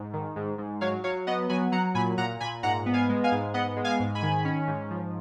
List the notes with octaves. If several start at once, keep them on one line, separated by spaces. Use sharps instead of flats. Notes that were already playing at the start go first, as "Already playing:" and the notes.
Already playing: G#2
D#3
G#2
G#2
F#3 C#5 F5
F#3 C#5 F5
B3 D#5 F#5
F#3 G#5 B5
F#3 F#5 A#5
A#2 G#5 B5
A#2 F#5 A#5
A#2 G#5 B5
G#2 F#5 A#5
B3
F5 G#5
G#3
F5 G#5
G#2
B3 D#5 F#5
G#3
F5 G#5
G#2
G#5 B5
D#3
C#4
G#2
F3